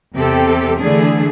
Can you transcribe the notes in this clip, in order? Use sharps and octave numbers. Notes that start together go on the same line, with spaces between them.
E2 C3 G4 A4
D3 E3 A3 D4 G#4